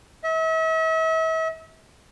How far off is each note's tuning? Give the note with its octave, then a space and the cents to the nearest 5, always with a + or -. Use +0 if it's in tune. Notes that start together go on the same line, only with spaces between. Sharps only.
E5 -40